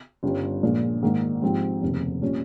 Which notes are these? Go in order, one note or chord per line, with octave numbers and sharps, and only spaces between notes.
G1 G2 G3 C#4
A#1 A#2 G#3
G#2 D#3 A#3
G#2 F3 C4 G4
F1 D#2 C#3
A#2 G3 C#4